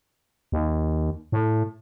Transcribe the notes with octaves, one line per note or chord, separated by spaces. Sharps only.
D#2
A2